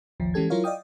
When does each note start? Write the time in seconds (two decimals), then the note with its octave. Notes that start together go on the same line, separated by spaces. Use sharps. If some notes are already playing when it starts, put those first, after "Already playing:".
0.20 A1 D#2 F3
0.34 E3 G#3 C#4 G4 A4 G#6
0.50 F#3 E4 F4 A#4 C#5 F5
0.64 D5 D#5 F5 G5 D#6